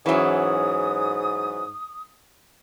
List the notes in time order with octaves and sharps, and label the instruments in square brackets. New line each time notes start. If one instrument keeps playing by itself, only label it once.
[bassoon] G#2 [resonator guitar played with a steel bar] E3 F#3 [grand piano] C#4 E5 [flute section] D#6